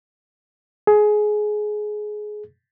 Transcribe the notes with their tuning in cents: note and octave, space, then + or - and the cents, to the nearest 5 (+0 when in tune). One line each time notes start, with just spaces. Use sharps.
G#4 +20